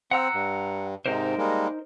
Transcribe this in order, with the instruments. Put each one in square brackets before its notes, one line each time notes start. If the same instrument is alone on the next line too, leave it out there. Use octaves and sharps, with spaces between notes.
[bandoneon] C4 [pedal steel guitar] F#5 A#5 E6
[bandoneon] G2
[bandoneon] G#2 C3 [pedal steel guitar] D#4 A#4 C5
[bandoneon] G3 G#3 A#3